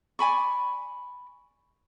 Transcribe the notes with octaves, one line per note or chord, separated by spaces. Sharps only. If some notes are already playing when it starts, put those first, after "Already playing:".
D5 G#5 B5 C#6